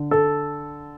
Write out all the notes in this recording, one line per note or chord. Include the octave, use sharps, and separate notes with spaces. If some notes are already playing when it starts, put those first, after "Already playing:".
Already playing: D3
A4